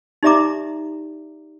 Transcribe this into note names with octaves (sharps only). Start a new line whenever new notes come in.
D#4 G4 D5 E5 A#5 D6